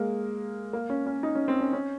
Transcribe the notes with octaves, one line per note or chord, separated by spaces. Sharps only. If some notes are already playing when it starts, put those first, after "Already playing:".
Already playing: G#3 A#3
A#3
C#4
C#4
D#4
C#4
C4
C#4
C#4